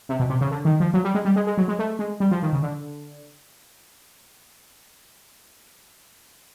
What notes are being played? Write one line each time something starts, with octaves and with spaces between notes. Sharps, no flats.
C3
B2
C3
C#3
D3
D#3
F3
F#3
G3
G#3
G3
G#3
G#3
F#3
G#3
A3
G#3
G3
F3
D#3
C#3
D3